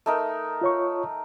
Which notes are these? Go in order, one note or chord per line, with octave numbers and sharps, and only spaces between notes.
A3 D#4 A#4
F4 C#5 C#6